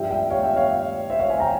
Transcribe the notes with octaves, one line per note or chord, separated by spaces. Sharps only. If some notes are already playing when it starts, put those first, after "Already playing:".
Already playing: G2 F3 E5 G5
E5 G5
C#5 F5
E5 G5
C#5 F5
C5 E5
C#5 F5
F5 G#5
G5 A#5